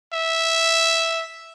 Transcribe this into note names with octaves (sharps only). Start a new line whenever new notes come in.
E5